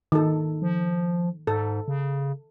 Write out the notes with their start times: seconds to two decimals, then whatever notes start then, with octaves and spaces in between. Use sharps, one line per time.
0.12 D#3 A4
0.62 F3
1.47 G#2 A4
1.88 C#3